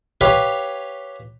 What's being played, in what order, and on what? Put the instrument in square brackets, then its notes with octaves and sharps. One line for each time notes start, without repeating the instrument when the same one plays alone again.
[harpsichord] G4 B4 C#5 F5